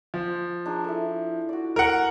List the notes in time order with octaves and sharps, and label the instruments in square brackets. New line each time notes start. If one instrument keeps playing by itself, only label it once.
[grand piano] F3
[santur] D4 D#4 G#4
E4 A4
F#4 D5
[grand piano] A#4 F#5